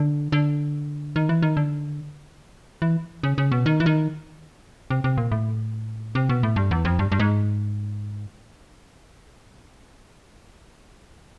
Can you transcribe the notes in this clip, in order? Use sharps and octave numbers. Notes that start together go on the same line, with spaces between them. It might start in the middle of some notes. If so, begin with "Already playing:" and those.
Already playing: D3
D3
D#3
E3
D#3
D3
E3
C#3
C#3
B2
D#3
E3
D#3
C3
C3
A#2
A2
C3
B2
A2
G2
E2
F2
G2
G2
G#2